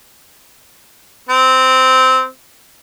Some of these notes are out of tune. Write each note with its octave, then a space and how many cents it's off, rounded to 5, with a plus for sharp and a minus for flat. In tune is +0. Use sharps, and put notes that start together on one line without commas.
C4 -10